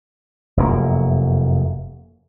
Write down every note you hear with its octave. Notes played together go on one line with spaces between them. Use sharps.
F1 F#2 A2 A#3